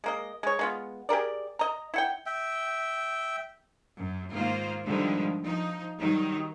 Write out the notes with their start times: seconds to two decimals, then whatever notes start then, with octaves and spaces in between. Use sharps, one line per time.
0.04 G#3 A#3 D#5
0.43 G#3 C#5
0.59 G#3 B3 F4
1.09 G4 G#4 A#4 D5
1.59 D#5 A#5
1.94 E4 F#5 G5
2.26 E5 G5
3.97 F#2
4.33 G#2 D#3 A#3 F4 C5
4.86 D3 D#3 F3 G3 G#3
5.44 F3 D#4
5.99 D#3 F#3 G3 D#4